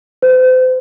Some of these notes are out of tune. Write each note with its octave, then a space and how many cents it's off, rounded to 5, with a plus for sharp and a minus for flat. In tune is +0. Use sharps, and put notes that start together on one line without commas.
C5 -35